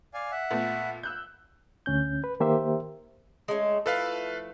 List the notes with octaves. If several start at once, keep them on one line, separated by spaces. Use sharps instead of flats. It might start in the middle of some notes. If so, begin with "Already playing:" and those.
D5 F5 G#5
E5 F#5
A#2 A3 B3
E6 F#6 G6
D2 C#4 G6
B4
D#3 A#3 G4 A#4 C5 E5
G#3 A3 C#4
F3 A3 E4 A4 B4 F5